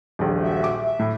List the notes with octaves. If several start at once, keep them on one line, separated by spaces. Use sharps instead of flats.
D#1 A#1
F#4 E5
D6
E5
A2